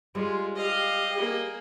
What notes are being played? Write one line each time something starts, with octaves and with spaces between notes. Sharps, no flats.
G3 G#3 F4
G4 D#5 F5
A#3 G#4